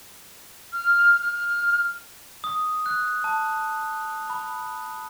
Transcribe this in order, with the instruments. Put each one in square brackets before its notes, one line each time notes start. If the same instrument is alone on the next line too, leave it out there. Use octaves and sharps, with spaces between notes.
[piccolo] F6
F6
[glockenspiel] D#6
F#6
A5
B5